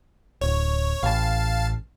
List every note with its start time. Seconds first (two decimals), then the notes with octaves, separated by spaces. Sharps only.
0.41 D1 C#5
1.03 A1 F5 A5